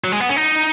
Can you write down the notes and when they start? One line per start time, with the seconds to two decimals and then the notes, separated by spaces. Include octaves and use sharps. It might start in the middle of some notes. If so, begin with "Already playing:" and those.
0.04 F#3
0.12 G#3
0.20 B3
0.29 C#4
0.36 D#4